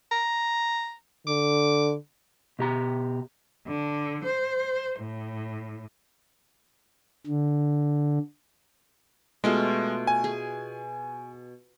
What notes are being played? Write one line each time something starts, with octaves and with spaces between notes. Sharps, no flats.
A#5
D3 D6
B2 G4 A#5
D3
C5
A2
D3
B2 G#3 A3 F4
G#5
G#4